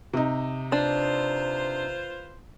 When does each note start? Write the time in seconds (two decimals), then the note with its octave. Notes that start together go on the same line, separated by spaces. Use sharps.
0.13 C3 D#4
0.72 D4 F4 B4 C5